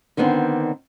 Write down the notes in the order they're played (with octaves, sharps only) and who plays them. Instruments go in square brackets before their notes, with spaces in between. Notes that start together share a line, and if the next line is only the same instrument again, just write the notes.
[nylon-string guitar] D3 D#3 G3 B3 C4 D4